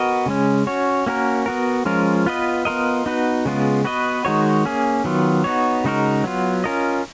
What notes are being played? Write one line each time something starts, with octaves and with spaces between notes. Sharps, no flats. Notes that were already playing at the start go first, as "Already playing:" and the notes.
Already playing: B3 F#4 A#4 D#5
C#3 G#3 C#4
C#4 F#4 C#5
A#3 C#4 F#4 A#4
B3 F#4 A#4
F3 G#3 C#4 F4 A#4
B3 F4 B4 D#5
B3 F4 A#4 D#5
B3 D#4 F#4 B4
C#3 G#3 B3 F4
B3 F#4 B4 D#5
D#3 G#3 D#4 F#4 C#5
A#3 C#4 G#4
D#3 F#3 B3 F4
B3 D#4 F#4 C#5
C#3 G#3 D#4 F#4 A#4
F#3 B3 F4
C#4 F4 A#4 D#5